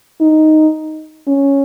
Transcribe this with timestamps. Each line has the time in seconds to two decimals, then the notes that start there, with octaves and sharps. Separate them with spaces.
0.21 D#4
1.27 C#4